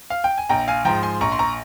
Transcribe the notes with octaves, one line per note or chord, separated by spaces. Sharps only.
F5
G5
G#5
A#1 G5 A#5
F5 G#5
G#2 F3 G5 A#5
G#5 C6
A#1 A#5 C#6
C6
A#5 C#6